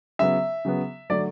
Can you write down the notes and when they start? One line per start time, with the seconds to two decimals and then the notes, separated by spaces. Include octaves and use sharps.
0.19 C#3 F#3 B3 E5
0.65 C#3 F#3 B3
1.10 D3 F#3 A3 D5